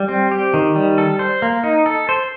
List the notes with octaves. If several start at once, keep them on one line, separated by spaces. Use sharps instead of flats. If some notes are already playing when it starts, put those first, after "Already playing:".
Already playing: G3
C4
G4
D#3
G3
A4
C5
A#3
D#4
A4
C5